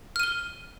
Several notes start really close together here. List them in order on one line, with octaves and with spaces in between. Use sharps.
F6 D#7 G7